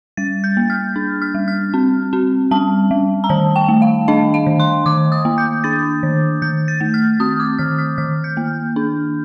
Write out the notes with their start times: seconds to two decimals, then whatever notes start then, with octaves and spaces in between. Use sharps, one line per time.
0.17 G3 A6
0.44 G6
0.57 A#3
0.70 F6
0.96 D4
1.22 F6
1.35 G3
1.48 F6
1.74 C4
2.13 C4
2.51 G3 A5
2.91 G3
3.24 A#5
3.29 D#3 A5
3.56 G5
3.68 A3
3.82 F5
4.08 D4 D#5
4.34 F5
4.47 D#3
4.60 C6
4.86 D#3 D6
5.12 D#6
5.25 A#3
5.38 G6
5.64 D4 A6
6.03 D#3
6.42 D#3 G6
6.68 A6
6.81 A3
6.94 F6
7.20 C4 D#6
7.40 D6
7.58 D#3 F6
7.78 F6
7.98 D#3 F6
8.24 G6
8.37 A#3
8.76 D4